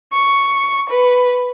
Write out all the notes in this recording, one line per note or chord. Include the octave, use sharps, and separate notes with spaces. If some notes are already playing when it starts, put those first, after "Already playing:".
C#6
B4